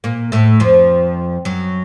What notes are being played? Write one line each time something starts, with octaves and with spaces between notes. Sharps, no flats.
A#2 A#3
A2 A3
F2 F3
F#2 F#3